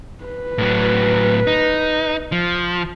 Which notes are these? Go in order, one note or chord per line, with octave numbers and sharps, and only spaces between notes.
B4
A2 F#3
D#4
F3